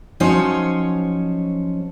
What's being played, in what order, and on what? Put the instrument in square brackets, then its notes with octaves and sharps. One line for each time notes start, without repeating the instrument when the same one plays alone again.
[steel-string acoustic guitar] F3 F#3 C#4 D#4 C5 C#5